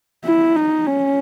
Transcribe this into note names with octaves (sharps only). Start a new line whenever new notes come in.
E4
D#4
C#4